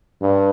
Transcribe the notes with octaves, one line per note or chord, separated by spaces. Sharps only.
G2